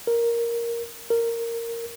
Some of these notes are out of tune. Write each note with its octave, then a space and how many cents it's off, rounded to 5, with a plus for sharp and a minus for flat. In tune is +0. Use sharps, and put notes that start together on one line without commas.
A#4 +5
A#4 -10